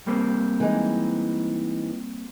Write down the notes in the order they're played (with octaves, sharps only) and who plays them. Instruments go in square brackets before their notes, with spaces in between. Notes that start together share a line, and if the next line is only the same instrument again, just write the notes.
[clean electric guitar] G3 A#3 C4
[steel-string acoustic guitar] E3 G#3 D#4